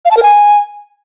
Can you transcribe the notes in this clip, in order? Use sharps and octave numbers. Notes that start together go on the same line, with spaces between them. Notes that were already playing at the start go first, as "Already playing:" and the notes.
F5
A5
A#4
G#5